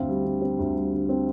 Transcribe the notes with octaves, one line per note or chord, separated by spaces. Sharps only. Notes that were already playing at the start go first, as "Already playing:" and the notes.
Already playing: D2 C4 F5
G3
D3
C4
D2
G3
D3
C4